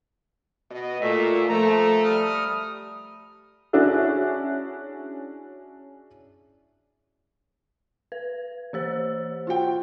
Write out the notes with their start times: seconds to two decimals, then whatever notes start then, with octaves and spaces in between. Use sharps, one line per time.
0.71 B2 D#5
1.01 A#2 A3 E5
1.49 F3 A3 A#5
2.04 G3 D#6 F6
3.73 C#4 D4 E4 F#4 G#4
8.12 B4
8.73 E3 G4 C5
9.47 F4 F#4 G5